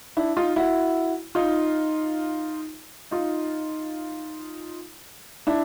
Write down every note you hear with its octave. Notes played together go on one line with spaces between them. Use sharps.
D4 E4
D#4 F4
E4 F#4
D#4 F4
D#4 F4
D4 E4